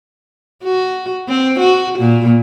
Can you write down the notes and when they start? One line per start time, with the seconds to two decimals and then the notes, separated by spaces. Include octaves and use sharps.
0.64 F#4
1.28 C4
1.59 F#4
1.99 A#2